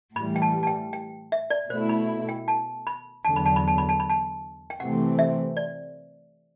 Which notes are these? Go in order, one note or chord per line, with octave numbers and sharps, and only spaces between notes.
A2 E3 G3 B5
G5
A5
A5
G5
G5
E5
D5
B2 A3 E4 C5
B5
G5
A5
B5
E2 D3 F#3 A5
B5
A5
B5
A5
B5
A5
B5
A5
G5
C3 E3 A3 C4 F#5
E5
D5